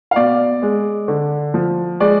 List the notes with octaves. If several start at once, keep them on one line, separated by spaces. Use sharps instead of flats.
F5
B2 D5
G#3
D3
F3
G#3 D5